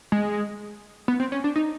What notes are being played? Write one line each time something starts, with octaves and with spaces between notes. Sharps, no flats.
G#3
B3
C4
C#4
D4
D#4